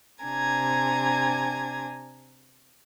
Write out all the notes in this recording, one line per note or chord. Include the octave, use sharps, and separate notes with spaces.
C3 D4 G#5 A#5 G#6